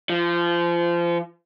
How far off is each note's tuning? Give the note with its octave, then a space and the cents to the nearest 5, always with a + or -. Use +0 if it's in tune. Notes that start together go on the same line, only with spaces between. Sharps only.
F3 -25